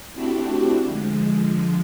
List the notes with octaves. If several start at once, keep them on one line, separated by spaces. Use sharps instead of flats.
A3 C4 D4 E4 F#4 G4
D3 F3 G#3